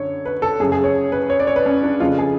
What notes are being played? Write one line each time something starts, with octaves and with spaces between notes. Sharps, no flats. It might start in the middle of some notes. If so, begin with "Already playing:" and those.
Already playing: F#2 D3 C#5
B4
A4
F#2 C#3 G#4
G#4
C#5
B4
C#5
D5
C#5
B4
C#4
D4
F2 C#3 F4
G#4